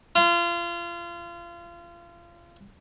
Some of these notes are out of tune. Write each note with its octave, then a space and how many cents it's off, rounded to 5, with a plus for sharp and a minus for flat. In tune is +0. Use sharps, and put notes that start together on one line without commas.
F4 -30